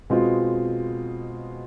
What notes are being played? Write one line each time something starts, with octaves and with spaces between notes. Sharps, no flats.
B2 G#3 C4 F4